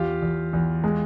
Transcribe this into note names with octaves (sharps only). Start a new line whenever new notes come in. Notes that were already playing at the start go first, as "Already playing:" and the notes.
Already playing: E2 F4 G4
E2
E2
G#3